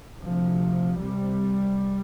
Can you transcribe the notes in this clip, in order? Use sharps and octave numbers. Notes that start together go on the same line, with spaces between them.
D2 C3 F3
C2 C3 G3